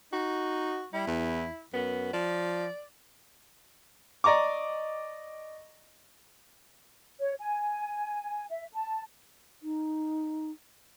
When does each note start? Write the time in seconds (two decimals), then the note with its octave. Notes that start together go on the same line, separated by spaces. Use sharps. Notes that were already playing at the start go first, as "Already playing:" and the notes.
0.13 D#4 F#4
0.93 G3 E4
1.07 E2
1.74 F#2 B3
2.13 F3 D5
4.24 D5 D#5 A#5 C#6 D6
7.18 C#5
7.40 G#5
8.50 E5
8.73 A5
9.63 D#4